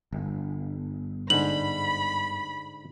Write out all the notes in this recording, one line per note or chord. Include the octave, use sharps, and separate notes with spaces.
G1
G#2 D3 G#3 B5 F#7